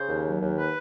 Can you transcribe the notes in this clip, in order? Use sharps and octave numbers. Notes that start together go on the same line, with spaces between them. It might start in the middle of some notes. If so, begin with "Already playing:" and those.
Already playing: C#3 C5
D#2
F#3
D#2
B4